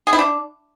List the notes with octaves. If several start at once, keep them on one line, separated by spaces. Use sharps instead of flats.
G#4
E4
D4